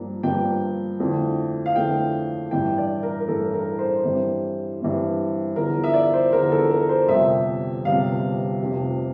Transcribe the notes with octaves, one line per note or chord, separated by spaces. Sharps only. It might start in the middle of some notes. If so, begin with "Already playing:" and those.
Already playing: G2 F3 A#3 D4
G2 F3 A#3 D4 G5
F2 D3 A3 E4
F5
F2 D3 A3 E4 G5
A1 G2 E3 G5
D5
A#4
A#4
A1 G2 E3 A4
A#4
C5
G2 E3 G3 C4
G2 E3 G3 C4
E2 D3 F3 A#4
E5
D5
C5
E2 D3 F3 A#4
A4
A#4
C5
G1 F2 C3 G3 E5
G1 F2 C3 G3 F5
F1 F2 C3